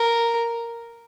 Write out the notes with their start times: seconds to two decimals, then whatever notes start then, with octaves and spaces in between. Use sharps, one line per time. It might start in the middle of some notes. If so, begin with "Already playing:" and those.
Already playing: A#4